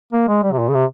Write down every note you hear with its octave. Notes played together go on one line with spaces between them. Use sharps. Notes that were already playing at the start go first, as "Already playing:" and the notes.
A#3
G#3
G3
C3
A#2
C#3
C3